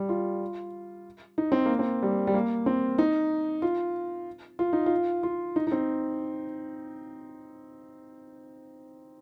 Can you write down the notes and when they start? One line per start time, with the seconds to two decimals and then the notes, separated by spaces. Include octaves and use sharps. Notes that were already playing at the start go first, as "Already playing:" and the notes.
Already playing: G3
0.09 F4
1.38 D#4
1.52 C4
1.66 A#3
1.79 C4
2.02 G3
2.27 G3
2.34 A#3
2.66 C4
2.98 D#4
3.62 F4
4.59 F4
4.73 D#4
4.86 F4
5.23 F4
5.56 D#4
5.67 D#4
5.72 C4